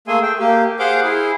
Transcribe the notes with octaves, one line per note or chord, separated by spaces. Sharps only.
A3 A#3 G#4 E5 G#5 C6
E5 G5
A#3 G4
G#4 C5 F5 F#5 D6 G6
E4 G#4